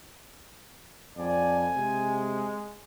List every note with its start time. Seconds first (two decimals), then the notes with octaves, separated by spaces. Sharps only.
1.17 F2 D5 G#5
1.76 C3 G#3